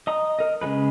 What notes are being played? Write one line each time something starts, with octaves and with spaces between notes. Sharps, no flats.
D#5 A#5 D#6
A#4 D#5
C#3 G3 G#3 B4